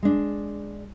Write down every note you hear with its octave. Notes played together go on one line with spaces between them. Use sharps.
G#3 D4